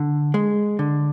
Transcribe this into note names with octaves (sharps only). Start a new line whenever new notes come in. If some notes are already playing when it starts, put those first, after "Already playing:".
Already playing: D3
G#3
D3